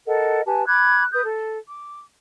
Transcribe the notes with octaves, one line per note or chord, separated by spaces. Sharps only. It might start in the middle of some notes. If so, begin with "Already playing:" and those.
A4 A#4 D#5 F#5
G4 B4 G#5 A5
B5 D6 F#6 G#6
B4 D#6 G6
A4
D6